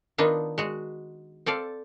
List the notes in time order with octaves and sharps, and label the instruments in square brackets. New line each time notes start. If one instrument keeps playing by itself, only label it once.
[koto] D#3 B3 D4 D#4 F4
G#3 F#4
C4 A4 D5 F5